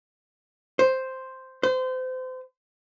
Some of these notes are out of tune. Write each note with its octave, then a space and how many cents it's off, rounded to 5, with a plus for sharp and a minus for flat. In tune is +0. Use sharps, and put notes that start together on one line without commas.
C5 +0
C5 -30